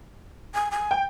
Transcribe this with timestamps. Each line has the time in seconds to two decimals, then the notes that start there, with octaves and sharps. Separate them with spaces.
0.54 G#5
0.71 G#5
0.91 G5